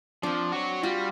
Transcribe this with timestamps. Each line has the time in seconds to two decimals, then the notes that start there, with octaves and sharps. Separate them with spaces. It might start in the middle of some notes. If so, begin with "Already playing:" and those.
0.23 F3 C4 D4
0.52 F#4 C#5
0.83 G3 F4 F#4